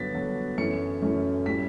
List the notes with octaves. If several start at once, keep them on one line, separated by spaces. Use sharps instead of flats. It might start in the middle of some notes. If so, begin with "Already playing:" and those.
Already playing: G2 D3 F#3 B3 A6 B6
G2 D3 F#3 B3
F#2 E3 A3 C#4 C#7
F#2 E3 A3 C#4
A2 G3 C#4 B6